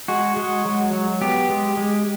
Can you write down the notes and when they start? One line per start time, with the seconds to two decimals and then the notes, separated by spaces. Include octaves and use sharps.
0.08 G#3 F#4
0.37 G#3
0.65 F#3
0.93 F#3
1.21 B3 G4
1.49 G#3
1.77 G#3